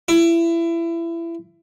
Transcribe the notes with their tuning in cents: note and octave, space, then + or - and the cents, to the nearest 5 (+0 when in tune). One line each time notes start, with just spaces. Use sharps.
E4 +25